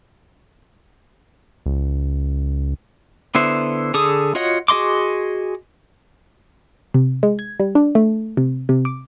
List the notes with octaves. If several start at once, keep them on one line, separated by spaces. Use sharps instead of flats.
C#2
D3 B3 E4 C5
D3 G#4 A4 D#6
F4 F#4 C#5 D#5 F#5
F#4 G#4 D#5 C6 D6
C3
G#3
G#6
G3
D4
A3
C3
C3
D6